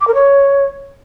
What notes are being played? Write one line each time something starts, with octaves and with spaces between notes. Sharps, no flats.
D6
A#4
C#5